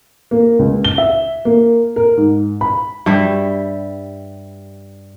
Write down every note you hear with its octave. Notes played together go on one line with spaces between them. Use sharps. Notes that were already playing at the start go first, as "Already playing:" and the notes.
A#3
C#2
G7
E5
A#3
A#4
G#2
B5
G2 G3 E5